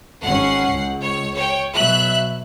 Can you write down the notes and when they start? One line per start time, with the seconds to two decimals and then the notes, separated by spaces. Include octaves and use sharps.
0.23 G#1 C#4 F#5 C7
0.69 C#2
1.02 C#5
1.35 C#5 G5
1.74 B2 F#3 E5 F#6